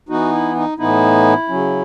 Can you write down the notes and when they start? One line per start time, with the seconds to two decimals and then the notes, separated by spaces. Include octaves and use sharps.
0.09 E3 B3 D#4 F#4
0.33 E4
0.55 D#4
0.78 A2 E3 B3 D#4 E4
1.48 C#3 F#3 C#4